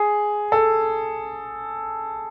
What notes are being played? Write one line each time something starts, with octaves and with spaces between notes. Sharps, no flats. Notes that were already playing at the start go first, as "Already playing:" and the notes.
Already playing: G#4
A4